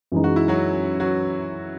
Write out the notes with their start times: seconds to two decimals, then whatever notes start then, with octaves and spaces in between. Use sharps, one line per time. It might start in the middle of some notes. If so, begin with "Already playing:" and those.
0.12 F#2 E3 G#3 D#4
0.24 F#4
0.36 E4
0.48 F#3 F#4
1.00 F#3 F#4